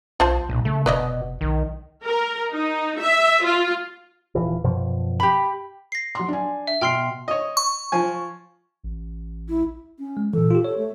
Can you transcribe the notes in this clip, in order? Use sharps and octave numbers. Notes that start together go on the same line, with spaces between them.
B1 F4 C5 A5
B1 A#2
C#3 A3
F1 B2 B4 D5 D#5
B1 D#3
A#4
D#4
E5
F4
D#1 E3 F3
F#2 B2 F3
G4 B5
A#6 C7
F#3 C6
D4 G#5
E5
B2 G5 C6 F6 C7
C#5 D#5
C#6
F3 G#5
A1
E4
C#4
G#3
A#2 E3 A4
F4 G4
C#5
A3